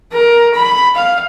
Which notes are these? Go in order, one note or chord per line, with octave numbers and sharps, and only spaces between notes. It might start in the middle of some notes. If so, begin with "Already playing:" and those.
A#4
B5
F5